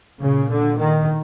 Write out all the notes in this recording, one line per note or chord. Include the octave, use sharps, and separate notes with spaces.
A#2 C#3
D3
D#3